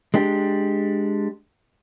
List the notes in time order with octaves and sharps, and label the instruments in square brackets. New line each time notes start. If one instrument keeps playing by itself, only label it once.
[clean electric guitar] G#3 D4 G4